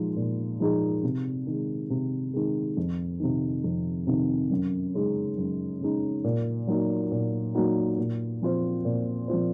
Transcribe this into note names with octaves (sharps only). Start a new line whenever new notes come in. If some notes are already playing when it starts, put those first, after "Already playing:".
Already playing: A#2 F3 G#3 D#4 G#4
A#2
F3 G#3 D#4 G#4
C3
D#3 G#3
C3
D#3 G#3
F2
C3 D#3
F2
C3 D#3
F#2
C#3 G#3 D#4
F#2
C#3 G#3 D#4
A#2
F#3 A#3 D#4 F#4
A#2
F#3 A#3 D#4 F#4
A#2
F3 C4 F4 C5
A#2
F3 C4 F4 C5